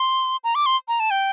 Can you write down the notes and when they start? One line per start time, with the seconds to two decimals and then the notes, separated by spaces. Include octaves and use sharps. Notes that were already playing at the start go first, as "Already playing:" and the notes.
Already playing: C6
0.44 A#5
0.55 D6
0.66 C6
0.88 A#5
1.00 A5
1.11 G5